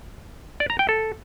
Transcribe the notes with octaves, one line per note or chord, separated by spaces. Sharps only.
D5
A#5
G5
A4